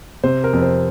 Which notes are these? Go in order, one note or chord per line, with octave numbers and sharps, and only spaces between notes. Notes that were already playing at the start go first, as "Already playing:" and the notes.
C3 C5
A#4
F2
C5